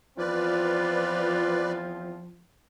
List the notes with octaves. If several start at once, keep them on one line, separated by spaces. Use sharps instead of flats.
E2 F3 C4 F4 B4 D5